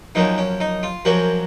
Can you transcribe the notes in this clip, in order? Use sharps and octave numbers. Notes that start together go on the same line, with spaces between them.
F#2 F3 A#3 C#4 D#4
C#4
D#4
F4
F#2 F3 A#3 C#4 F#4